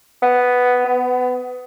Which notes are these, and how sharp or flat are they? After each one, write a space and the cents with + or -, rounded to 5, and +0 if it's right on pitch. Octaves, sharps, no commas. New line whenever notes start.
B3 +5
B3 +25